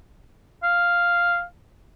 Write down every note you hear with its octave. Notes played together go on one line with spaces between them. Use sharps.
F5